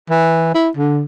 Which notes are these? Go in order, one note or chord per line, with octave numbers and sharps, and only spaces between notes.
E3
E4
D3